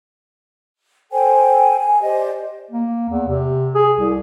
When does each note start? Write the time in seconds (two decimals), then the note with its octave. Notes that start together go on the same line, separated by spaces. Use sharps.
1.12 A4 C5 G5 G#5
1.80 G#5
2.01 G4 C5 D5 D#5
2.71 A#3
3.09 E2
3.28 C3
3.75 G#4
3.98 C2